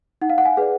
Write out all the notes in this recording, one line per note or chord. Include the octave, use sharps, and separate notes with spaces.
D#4 F#5
F5
F#5
F5 G#5
G#4 B4 D5